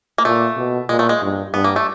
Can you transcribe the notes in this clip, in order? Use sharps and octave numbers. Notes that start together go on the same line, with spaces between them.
A#3
A#2 A3
B2
A#2 G#3
A3
G#3
G2
G2 B3
A#3
A3